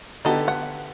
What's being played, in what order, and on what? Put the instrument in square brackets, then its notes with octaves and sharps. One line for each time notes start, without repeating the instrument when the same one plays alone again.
[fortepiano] D3 B3 G4 [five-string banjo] D#4 A4
[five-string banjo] F#5